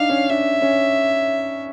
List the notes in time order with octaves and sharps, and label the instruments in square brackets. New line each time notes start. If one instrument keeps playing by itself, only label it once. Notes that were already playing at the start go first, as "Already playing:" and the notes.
Already playing: [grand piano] D4 D#4 [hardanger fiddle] F5
[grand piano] C#4
[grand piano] D4 [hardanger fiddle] E5
[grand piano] C#4